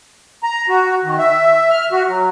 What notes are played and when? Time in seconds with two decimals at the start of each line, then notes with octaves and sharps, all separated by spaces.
0.43 A#5
0.69 F#4
1.04 D#3
1.19 E5
1.70 F6
1.92 F#4
2.08 F#3